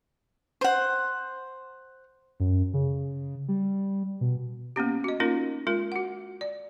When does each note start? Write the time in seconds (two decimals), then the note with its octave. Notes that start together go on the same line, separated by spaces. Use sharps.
0.61 C5 F#5
2.40 F#2
2.74 C#3
3.48 G3
4.21 B2
4.76 A#3 B3 C#4 G4
5.04 F#4 D#5
5.20 A#3 C#4 D#4 F4 A#4
5.67 G#3 F4 A#4
5.92 F#4 F#5
6.41 D5